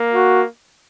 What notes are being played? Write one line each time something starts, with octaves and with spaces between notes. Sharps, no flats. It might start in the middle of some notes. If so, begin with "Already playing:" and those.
Already playing: A#3
F#4